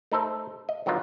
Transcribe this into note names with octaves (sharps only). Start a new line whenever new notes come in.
A3 D#4 A4 C5
D#5
D3 F#3 B3 D#4 F4